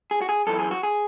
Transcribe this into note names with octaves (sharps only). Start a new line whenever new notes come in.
G#4
F#4
G#4
F#2 E3 A4
G#4
F#4
G#4